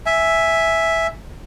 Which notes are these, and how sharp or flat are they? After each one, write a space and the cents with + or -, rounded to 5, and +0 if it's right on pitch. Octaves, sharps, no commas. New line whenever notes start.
E5 +0 G#5 +0